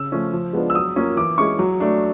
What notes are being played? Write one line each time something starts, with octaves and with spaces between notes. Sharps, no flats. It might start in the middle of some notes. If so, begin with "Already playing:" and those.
Already playing: C#3 E6
F3 A3 C#4
F3
G#3 B3 D4 F4
E6
F#3 D#6
A#3 C#4 F4
E3 D6
G#3 C#4 E4 C#6
F#3
A3 D4